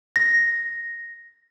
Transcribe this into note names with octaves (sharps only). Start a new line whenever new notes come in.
A#6